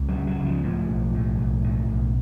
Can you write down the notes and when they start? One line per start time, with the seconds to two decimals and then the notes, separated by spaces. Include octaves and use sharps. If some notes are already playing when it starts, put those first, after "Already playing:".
Already playing: C#2
0.09 F#3
0.15 C#3
0.27 F#3
0.40 C#2
0.45 F3
0.64 A2 F3
0.90 B1
1.15 A2
1.39 B1
1.65 A2
1.89 B1